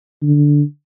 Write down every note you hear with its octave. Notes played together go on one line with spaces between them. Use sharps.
D3